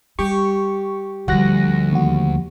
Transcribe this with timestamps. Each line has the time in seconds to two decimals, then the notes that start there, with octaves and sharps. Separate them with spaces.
0.19 G3 G4 C#6
1.28 D2 F3 G3 F#4 F#6 A#6
1.93 D#2 F#4